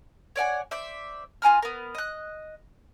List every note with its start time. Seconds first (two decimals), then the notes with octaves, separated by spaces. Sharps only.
0.36 C#5 D5 F#5 G#5
0.71 C5 D5 E5
1.42 F4 G#5 A#5 F6
1.62 B3 A#4
1.95 D#5 F#6